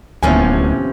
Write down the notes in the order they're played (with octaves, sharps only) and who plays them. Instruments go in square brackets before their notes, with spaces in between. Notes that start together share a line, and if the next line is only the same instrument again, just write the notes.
[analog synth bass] D1 [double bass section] D#2 B3 [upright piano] A2 G#5 [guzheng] C3 F3 C#4